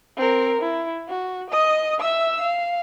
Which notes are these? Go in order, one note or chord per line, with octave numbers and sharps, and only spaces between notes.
C4 A#4
E4
F#4
D#5 D#6
E5 E6
F5